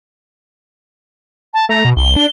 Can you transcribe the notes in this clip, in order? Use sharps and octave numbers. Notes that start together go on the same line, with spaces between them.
A5
A3 A#5
B2
C2 G7
D4